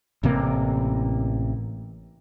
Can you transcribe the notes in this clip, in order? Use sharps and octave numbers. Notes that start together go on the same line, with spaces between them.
A1 C3 A#3